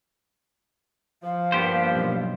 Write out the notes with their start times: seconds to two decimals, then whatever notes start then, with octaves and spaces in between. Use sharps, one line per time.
1.23 F3 F5
1.52 G2 A#3 B3 G4 C5
1.95 B1